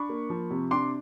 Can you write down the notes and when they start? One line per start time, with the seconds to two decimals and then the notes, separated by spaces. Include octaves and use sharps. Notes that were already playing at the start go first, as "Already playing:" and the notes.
Already playing: D4 B5 C#6
0.09 A#3
0.30 F3
0.50 C3
0.71 D4 C6 D6